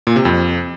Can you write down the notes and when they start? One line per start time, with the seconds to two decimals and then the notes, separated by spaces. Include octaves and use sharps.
0.07 A#2
0.16 C3
0.25 F2